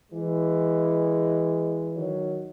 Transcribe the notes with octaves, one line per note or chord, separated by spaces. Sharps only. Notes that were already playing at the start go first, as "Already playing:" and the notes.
E3 G#3
D#3 F#3